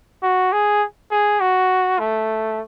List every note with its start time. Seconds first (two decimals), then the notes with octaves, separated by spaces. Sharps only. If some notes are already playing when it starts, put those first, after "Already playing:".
0.23 F#4
0.53 G#4
1.11 G#4
1.41 F#4
1.99 A3